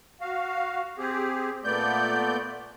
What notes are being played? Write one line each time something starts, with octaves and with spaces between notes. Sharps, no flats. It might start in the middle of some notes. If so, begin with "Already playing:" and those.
F#4 F5
C4 G4 G#4
A#2 A3 B3 D5 G6